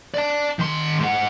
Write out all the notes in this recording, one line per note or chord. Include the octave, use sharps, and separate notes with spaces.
D5 A5
D#3 C6
G#2 F#5